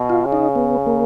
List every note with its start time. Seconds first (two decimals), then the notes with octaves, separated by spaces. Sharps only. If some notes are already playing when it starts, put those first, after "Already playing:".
Already playing: B2
0.10 F4
0.25 C#3
0.32 D#4
0.56 B3
0.86 A#3